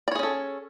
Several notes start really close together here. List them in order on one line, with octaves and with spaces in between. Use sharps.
D5 C#5 G#4 C#4 A4